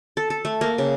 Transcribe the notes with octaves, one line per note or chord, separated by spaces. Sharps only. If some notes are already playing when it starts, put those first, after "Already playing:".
A4
A4
A3
A#3
C#3